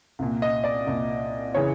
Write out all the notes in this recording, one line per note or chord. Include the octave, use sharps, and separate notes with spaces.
C2 A#2
D#5
D5
C2 A#2
C#3 E3 C#5